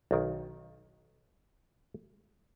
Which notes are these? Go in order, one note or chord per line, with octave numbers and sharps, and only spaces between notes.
B1 D#3